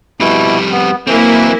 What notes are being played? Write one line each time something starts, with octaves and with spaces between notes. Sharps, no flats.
F2 B2 G3 E4
B3
E3 F#3 A#3 C4 E4